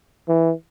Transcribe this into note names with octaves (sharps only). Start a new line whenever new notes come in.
E3